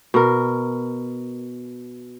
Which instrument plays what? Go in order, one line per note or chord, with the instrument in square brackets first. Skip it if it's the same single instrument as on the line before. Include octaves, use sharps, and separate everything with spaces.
[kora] B2 A#4